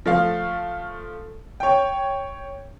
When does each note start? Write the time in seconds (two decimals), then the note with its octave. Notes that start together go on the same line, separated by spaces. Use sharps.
0.06 F3 A3 F5
1.60 C#5 G5